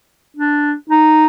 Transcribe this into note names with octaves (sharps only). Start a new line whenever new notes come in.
D4
D#4